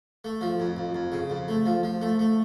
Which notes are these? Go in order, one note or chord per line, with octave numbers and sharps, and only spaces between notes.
A3
F3
F2
F2
F2
C#3
F2
A3
F3
F3
A3
A3